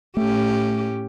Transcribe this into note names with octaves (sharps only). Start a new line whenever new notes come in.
A2 A3 C#4 G4